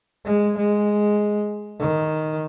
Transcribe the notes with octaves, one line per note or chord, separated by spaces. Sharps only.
G#3
G#3
D#3